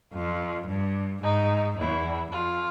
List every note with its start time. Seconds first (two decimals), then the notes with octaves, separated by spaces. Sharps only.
0.13 F2 F4
0.67 G2
1.22 G#2 D#4
1.78 E2 E4
2.31 F2 F4